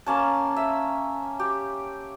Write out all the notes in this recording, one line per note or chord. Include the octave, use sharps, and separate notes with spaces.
A#3 C#4 A5
E5
G4